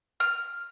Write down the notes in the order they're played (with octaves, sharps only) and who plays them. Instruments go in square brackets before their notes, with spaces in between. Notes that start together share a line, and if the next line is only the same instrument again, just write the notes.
[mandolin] F6